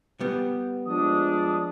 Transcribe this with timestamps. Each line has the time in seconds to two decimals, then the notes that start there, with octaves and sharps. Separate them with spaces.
0.20 G3 B3
0.86 F3 G#3 D4 D#6